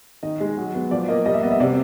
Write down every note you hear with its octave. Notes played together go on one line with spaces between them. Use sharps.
D#3 D#5
G#3
F#3
B3
F3 D5
A#3 D#5
G3 D#5
E5
B3 D#5
E5
C3 D5